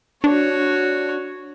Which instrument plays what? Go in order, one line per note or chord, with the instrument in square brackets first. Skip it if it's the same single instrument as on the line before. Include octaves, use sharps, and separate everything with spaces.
[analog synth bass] D4 [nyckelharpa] F#4 C#5